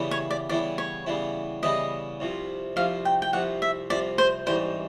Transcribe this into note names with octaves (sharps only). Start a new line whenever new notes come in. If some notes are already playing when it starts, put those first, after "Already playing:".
Already playing: C#3 E3 G3 B3 E4
C#5
D5
C#3 E3 G3 B3 E4 D5
C#5
C#3 E3 G3 B3 E4
C#3 E3 G3 B3 E4 D#5
C2 C3 F3
C2 C3 F3 F5
G5
G5
C2 C3 F3 F#5
E5
C2 C3 F3 D5
C5
A1 G#2 E3 G3 C5